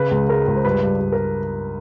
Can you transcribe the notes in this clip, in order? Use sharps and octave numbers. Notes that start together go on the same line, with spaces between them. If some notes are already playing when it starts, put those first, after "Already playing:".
Already playing: C#3 B4
C#2
G#3 A#4
C#2
C5
G2 B4
G2
G2
A#4